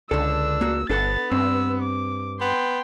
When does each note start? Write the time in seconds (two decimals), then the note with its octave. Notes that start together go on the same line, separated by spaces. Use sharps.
0.11 C#2 D3 D4 A4 E6
0.61 A#3 F#4
0.89 G1 B3 D4 A4 F#5 A6
1.32 G2 C4 E6
1.82 D6
2.41 B3 G5 C6